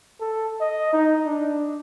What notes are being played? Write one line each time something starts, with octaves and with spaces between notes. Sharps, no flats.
A4
D#5
D#4
D4